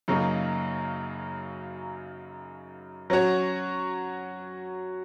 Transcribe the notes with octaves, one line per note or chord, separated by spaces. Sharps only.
F#2 C#3 F#3 A#3 D#4
F#3 C#4 F#4 C#5